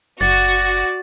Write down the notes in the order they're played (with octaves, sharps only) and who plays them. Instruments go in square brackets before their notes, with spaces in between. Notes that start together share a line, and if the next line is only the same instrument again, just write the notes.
[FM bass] F#1 [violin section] F#4 [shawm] D5 [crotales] A6